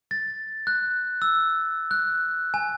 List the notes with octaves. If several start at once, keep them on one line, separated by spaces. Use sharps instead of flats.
A6
F#6
E6
F#6
G#5